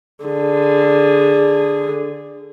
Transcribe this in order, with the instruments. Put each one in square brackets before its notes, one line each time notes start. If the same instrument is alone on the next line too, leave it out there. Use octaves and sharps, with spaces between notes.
[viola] D3 G#4